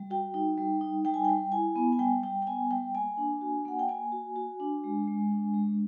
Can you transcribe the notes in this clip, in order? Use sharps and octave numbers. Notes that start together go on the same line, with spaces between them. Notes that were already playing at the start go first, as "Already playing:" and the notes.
Already playing: G3
F#4 G5
D#4
G3
D#4
G3 G5
G#5
G3 G5
E4 G#5
B3
G#5
G3 G5
G3 G5
G5
B3 G#5
G3 G5
A#3 G#5
D4
F#4
A#3 F#5
G5
A#3 G#5
F#4
F#4
D4
G#3
G#3
D4
G#3